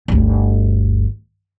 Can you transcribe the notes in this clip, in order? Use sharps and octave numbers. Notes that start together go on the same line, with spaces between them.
G1 D2